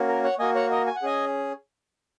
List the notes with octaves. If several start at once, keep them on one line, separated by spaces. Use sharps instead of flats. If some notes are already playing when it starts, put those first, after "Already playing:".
Already playing: A#3 C#4 F#4
A#4
C#5 F#5
A#3 F#4 D#5 G#5
C#5 F#5
A#4 D#5
G#5
F#5
C#4 G#4 D#5 G#5